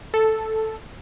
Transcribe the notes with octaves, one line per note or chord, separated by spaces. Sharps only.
A4